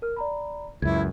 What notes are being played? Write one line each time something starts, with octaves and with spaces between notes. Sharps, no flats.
A#4 F6
D5 A#5 B5
C#2 F#2 E4 G#6